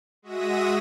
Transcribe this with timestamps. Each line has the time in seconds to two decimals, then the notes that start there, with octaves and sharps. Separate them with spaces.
0.22 G#3 F#4 E5 D#6 A#6 D#7